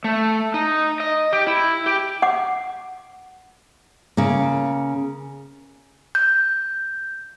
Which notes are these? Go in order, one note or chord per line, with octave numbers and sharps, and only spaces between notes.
A3
D#4
D#5
G4
E4
G4
F#5 D6
C#3 A#3
G6